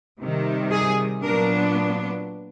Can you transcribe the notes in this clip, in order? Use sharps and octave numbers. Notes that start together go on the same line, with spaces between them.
C3 D#3 G3
G#4
A#2 F#3 B3 D4 A#4